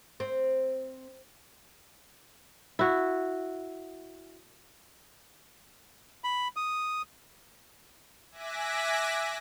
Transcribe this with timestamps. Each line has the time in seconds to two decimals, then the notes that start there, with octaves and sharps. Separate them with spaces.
0.20 C4
2.79 E4 F#4
6.24 B5
6.56 D#6
8.31 E5 G#5 D6 F#6 A#6 B6